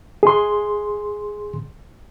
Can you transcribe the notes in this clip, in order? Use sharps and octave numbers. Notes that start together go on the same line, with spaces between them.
G#4 C6